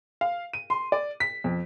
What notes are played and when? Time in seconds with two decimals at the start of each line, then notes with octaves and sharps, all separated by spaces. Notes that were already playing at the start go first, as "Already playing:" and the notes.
0.21 F5
0.53 D#7
0.70 C6
0.92 D5
1.20 B6
1.44 F2